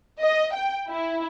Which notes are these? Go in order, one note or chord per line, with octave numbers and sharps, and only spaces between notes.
D#5
G5
E4